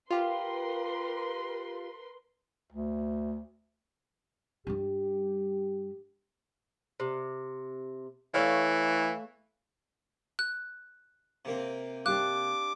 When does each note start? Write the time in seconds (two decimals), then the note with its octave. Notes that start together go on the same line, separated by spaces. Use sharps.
0.10 F4 G4 A#4 B4 C6
2.73 D2
4.67 G2 G3 G4
7.00 C3
8.34 E3 A3 C#5 F5
10.39 F#6
11.45 C3 A#3 C4
12.06 D4 G4 F5 D6 F#6